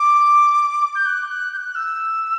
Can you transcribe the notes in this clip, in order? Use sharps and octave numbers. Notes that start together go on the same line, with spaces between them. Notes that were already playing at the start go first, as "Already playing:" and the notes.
Already playing: D6
G6
F#6
F#6
G6
F#6
E6